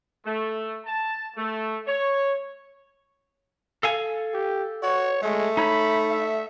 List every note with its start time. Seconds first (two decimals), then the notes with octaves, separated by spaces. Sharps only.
0.25 A3
0.86 A5
1.36 A3
1.87 C#5
3.83 A4 F5 G#5
4.34 G4
4.83 F#4 C#5
5.23 G#3 A3
5.57 D#4 C#5 B5
6.11 E5